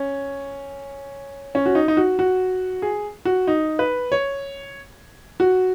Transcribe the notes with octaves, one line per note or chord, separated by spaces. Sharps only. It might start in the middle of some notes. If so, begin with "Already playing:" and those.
Already playing: C#4
C#4
F#4
D#4
D#4
F#4
F#4
G#4
F#4
D#4
B4
C#5
F#4